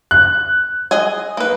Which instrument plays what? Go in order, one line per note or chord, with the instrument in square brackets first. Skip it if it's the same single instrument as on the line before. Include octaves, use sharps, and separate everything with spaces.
[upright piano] F#6
[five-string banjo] G#4 D#5 G#5
A#3 B4